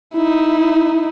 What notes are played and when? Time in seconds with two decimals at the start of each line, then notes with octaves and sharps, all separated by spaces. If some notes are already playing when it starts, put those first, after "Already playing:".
0.14 D#4 E4